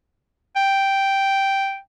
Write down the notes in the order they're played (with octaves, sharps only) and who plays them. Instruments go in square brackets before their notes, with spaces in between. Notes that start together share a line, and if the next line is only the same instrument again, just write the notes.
[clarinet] G5